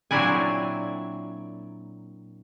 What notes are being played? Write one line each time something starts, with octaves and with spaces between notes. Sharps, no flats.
A#2 F#3 C4 D4 E4 G#5